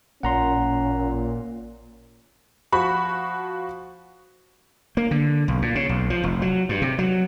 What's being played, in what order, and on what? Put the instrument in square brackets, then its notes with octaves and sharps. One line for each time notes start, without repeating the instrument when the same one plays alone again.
[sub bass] A1 [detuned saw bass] A#2 [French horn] C#4 [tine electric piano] F#5 A#5 C6
[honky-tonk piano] F3 F#4 B5 C#6
[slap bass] A#3
D3
B1
A#2
C#3
B1
F3
F1
F#3
G2
C3
F#3